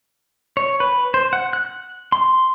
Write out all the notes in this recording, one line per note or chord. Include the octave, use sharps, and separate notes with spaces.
C#5
B4
C5
F#5
F#6
C6